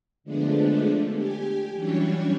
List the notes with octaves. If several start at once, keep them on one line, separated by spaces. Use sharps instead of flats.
D3 F3 G#3 A3 B3 D4
G4 G#5
E3 F#3 G3 C#4 D4 C#5